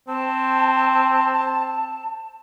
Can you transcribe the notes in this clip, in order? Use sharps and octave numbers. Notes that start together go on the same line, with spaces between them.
C4 A5